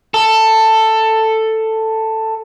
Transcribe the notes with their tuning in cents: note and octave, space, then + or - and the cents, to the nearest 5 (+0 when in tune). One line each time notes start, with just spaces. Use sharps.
A4 +10